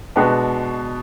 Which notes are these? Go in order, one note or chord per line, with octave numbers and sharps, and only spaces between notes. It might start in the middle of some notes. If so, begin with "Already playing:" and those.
B2 G#3 D4 F#4 B4